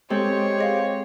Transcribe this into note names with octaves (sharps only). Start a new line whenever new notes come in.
G#3 C4 G4 A4 C5 C#5
G#4 D#5 F5